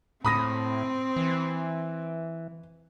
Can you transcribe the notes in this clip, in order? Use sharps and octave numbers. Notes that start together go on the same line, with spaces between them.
A2 C4 B5 D#6 A#6
E3